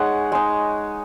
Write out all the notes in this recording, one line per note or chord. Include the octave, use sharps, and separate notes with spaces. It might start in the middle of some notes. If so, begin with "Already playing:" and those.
Already playing: G#3 D#4 C#5 D#5 F#5 G#5
G#3 D#4